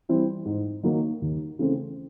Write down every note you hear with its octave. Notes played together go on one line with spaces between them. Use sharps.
E3 G3 C4 E4
G#2
D#3 F#3 A#3 D#4
D#2
C#3 E3 A3 C4